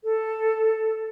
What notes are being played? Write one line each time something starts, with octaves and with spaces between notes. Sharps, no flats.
A4